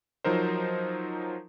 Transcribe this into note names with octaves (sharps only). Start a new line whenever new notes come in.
F3 F#3 D#4 A#4 C5